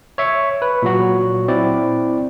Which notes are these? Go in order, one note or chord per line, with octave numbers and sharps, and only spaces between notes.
C#5 E5 C#6
B4
A#2 F#3 F#4
C4 E4 D5